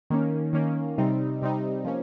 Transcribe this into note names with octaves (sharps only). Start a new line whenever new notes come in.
D#3 A#3 C#4
D#3 A#3 C#4
C3 G3 C4 D#4
C3 G3 C4 D#4
F3 A#3 C#4